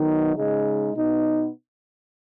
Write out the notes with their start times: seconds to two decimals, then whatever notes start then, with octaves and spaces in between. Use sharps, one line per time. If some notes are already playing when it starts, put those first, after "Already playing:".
Already playing: D#3 F#3 B3 D#4
0.37 C#3 G#3 D#4 G#4 D#5
0.93 B2 B3 D#4